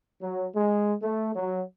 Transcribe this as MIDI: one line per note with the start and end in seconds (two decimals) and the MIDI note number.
0.21 0.47 54
0.56 0.94 56
1.02 1.31 57
1.36 1.63 54